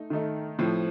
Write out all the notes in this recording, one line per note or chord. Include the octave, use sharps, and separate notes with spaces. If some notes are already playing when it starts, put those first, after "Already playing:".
Already playing: A3 D#4
D#3 A3 D#4
A2 F3 C4